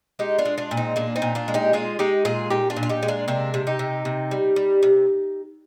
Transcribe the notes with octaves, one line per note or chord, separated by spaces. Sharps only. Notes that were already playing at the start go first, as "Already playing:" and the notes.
G#3 D#4 G4
D4 F4
G#3
D4 F4
A#2
C4 D#4
A#2 A#3 D4
C4 D#4
A#2
D4 F4
G#3
D#4 G4
G#3 F4 G#4
G#3 D#4 G4
A#2 F4 G#4
A#2 D#4 G4
D4 F4
A#2
F4
D#4 G4
G#3
D4 F4
C3 A#3 D4
C3
D#4 G4
C3
C3
G3
G3
C3